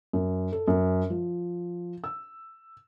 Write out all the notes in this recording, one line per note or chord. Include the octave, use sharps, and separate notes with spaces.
F#2
A4
F#2
F3
E6